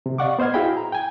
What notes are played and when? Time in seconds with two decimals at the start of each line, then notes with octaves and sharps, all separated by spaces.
0.06 C3
0.18 D5 D#5 F5 F#5 C#6 D6
0.39 B3 C5 D#5 F6 G#6
0.54 E4 F#4 G#4 F5 G5 B5
0.77 A#5
0.92 G5 G#5